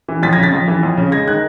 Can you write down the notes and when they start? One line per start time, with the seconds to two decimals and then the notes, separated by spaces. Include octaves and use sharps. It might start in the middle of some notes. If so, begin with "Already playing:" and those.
0.08 E3
0.23 F2 A6 B6
0.33 C#3 G#6 A#6
0.43 A6 B6
0.52 F2
0.68 E3
0.83 F2
0.97 C#3
1.12 G#3 G#6 A#6
1.27 D#3 F#6 G#6